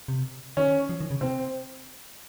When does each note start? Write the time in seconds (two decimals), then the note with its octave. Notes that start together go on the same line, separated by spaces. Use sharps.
0.08 C3
0.57 D#3 C#4
0.89 F3
1.00 D#3
1.11 C#3
1.21 C3 C4